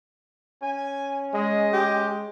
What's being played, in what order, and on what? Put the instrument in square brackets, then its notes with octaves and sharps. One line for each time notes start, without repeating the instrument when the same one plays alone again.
[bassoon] C#4 [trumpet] G#5
[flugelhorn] G#3 [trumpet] D#5
[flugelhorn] G#3 [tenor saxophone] G4